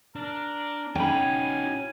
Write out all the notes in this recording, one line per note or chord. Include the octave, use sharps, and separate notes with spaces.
D4 A#4
C#4 D#4 F#4 G5 G#5 B5